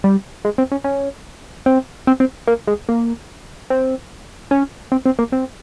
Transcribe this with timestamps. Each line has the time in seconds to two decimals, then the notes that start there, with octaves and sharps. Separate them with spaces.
0.04 G3
0.45 G#3
0.58 C4
0.72 C#4
0.84 C#4
1.66 C4
2.07 C4
2.20 C4
2.47 A#3
2.67 G#3
2.89 A#3
3.70 C4
4.51 C#4
4.92 C4
5.06 C4
5.19 A#3
5.32 C4